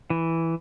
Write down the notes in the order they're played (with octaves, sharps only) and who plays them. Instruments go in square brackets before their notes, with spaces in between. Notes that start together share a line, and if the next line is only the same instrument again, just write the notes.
[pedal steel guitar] E3